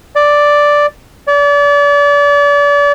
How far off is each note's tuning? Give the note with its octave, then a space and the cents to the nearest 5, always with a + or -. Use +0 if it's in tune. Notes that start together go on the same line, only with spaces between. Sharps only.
D5 +0
D5 -35